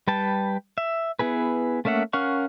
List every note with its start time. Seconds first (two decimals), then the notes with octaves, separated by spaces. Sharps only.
0.07 G3 B4 G5 A5
0.78 E5
1.19 B3 E4 G#4 B4
1.85 A3 A#3 C#4 E5 F#5
2.13 C#4 A#4 F5 F#5 C#6